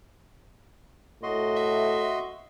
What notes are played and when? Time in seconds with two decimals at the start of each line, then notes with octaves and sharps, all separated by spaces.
1.23 A2 F#4 D#5 C6
1.56 E5